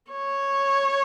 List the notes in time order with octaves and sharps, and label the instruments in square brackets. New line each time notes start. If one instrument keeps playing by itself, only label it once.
[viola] C#5